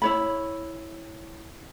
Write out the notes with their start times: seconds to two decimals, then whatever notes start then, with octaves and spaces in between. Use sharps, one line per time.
0.02 E4 C#5 B5